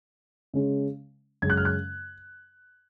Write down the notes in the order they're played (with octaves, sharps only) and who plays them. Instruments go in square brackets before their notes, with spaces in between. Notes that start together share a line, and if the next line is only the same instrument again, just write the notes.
[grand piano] C#3 G#3 C#4
F#2 C#3 G#3 C#4 G#6
F#6
F6
F#6